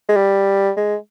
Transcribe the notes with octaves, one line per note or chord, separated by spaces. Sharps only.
G#3
G3
G#3